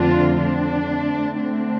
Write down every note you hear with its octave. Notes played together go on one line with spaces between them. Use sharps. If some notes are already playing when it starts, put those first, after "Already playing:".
Already playing: F2 D3 A3 C4 D4 F4
D4
D3 A3 C4
D4